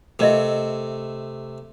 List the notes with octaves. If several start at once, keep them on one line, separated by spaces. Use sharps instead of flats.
C3 A3 A#4 D#5 E5